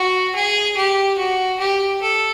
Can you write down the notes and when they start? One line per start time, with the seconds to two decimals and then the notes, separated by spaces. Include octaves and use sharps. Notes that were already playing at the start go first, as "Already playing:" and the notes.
Already playing: F#4
0.35 G#4
0.76 G4
1.18 F#4
1.59 G4
2.01 A4